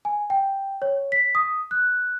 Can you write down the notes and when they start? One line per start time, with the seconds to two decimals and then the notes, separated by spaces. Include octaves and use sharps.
0.05 G#5
0.30 G5
0.82 C#5
1.12 B6
1.35 D#6
1.71 F#6